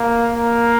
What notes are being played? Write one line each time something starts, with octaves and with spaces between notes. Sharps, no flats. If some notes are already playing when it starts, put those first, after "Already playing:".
Already playing: A#3
A#3